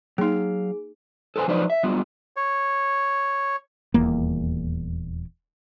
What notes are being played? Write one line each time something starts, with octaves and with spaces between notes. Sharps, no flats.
F#3 A#3 D#4 G#4 F5
A4 B4 C5 G5 G#5
F3 F#3 D#4 B4 C5 D5
E5
F#3 G3 B3 F4
C#5
D#1 E2 A#3